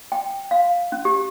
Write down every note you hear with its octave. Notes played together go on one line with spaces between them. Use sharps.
G5
F5
C#4
G4